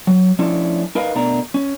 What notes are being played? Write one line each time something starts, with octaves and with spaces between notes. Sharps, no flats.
F#3
F3 A3 C#4 D4 E4
D#4 A#4 B4 D#5 F5
B2 A3 D4 A#4 A#5
C#4